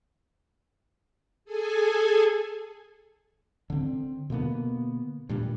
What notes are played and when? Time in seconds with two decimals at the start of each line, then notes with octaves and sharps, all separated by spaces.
1.45 G#4 A4 G#5
3.70 D3 C4
4.30 B2 D3 A#3 B3
5.29 G2 A#2 G3